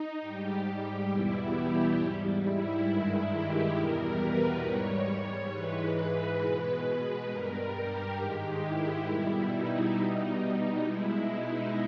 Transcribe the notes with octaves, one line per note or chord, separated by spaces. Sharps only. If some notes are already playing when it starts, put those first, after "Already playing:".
Already playing: D#4
G#2 G3 G4
E2 B2 G3 E4
G4
G#2 G3
E4
G2 D#3 G#3
G4
E2 B2 G3 A#4
B4
G#2 G3 C#5
G#2 E3 G#3 B4
B4
B2 G#3 B4
B4
G2 G3 A#4
G4
G#2 D#3 G#3
E4
B2 G3
D#4
B2 G3
D#4
B2 G#3 E4
D#4